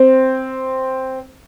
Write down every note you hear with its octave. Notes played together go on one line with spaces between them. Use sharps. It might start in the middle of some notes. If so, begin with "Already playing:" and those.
Already playing: C4